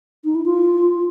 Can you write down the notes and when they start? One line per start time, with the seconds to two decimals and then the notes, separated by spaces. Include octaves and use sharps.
0.24 D#4
0.35 E4
0.45 F4